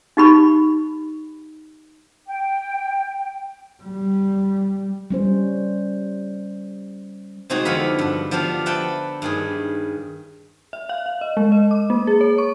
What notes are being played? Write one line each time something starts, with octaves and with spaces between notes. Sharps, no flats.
D#4 G4 B5 C#6
G5
G3
G3 C#4 C5
C3 G#3 C4 D#4 F#4
F2 D3 B3 F5 B5
G2 F#5
F3 B3 D4 G4 F5
B4 E5 F#5 G5 A5
G2 D#3 G#4
E5
F5
F5
D#5
G#3
D#5
D6
A#3
G#4
C#5
C#6